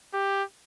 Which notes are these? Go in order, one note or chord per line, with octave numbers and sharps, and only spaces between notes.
G4